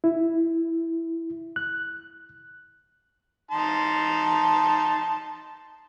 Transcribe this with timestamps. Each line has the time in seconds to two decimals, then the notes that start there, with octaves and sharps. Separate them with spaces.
0.04 E4
1.56 F#6
3.51 D#4 A5 C6